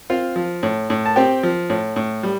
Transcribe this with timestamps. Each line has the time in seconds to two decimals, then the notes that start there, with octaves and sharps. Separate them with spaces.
0.10 C4 F4 F5
0.36 F3
0.63 A2
0.90 A2
1.05 A5
1.16 C4 G4 G5
1.43 F3
1.70 A2
1.96 A2
2.23 G3